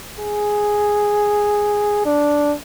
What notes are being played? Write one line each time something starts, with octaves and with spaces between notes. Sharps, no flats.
G#4
D4